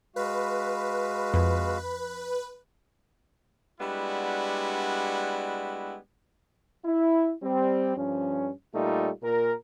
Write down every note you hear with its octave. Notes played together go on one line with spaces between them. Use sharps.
G#3 F#4 B4 F5
F2
G3 G#3 B3 D4 E4 F#4
E4
G3 C4
G2 F3 C#4
A#2 G3 A3 D#4 F4
A#2 A#4